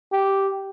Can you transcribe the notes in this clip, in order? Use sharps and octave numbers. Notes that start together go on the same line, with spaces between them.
G4